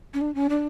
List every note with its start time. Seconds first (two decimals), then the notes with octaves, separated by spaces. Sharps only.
0.14 C#4
0.21 D4
0.35 C#4
0.49 D4